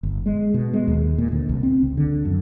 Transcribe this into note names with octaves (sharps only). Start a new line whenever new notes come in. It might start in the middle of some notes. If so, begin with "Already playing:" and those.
G1
G#3
B2
G#3
D#2
A#2
D2
C2
C4
C#2
D3
F#2